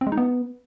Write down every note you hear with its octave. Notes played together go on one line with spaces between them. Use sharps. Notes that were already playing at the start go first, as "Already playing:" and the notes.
C4
G#3
D#4
B3